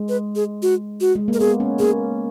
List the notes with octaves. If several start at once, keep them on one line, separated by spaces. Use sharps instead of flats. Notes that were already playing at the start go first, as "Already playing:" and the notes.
Already playing: G#3
B4
G#4
F#4
F#4
G#3
A#3
A#4
B3 G#4
C#4
A#3 G#4